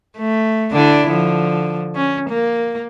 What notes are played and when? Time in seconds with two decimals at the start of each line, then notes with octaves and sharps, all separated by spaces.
0.18 A3
0.72 D3 D4 E4
1.08 D3 F3
1.95 C#4
2.30 A#3